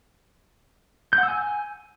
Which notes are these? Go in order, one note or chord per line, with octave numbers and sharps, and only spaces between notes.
G6
F#5
E6
G#5